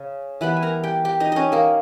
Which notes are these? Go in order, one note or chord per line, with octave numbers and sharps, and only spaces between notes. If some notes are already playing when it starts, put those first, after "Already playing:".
Already playing: C#3
E3 G3 B3 B4 B5
G#5
A#4 A#5
G4 G5
G4 G5
D#4 D#5
C#4 C#5 D#5
A#3 A#4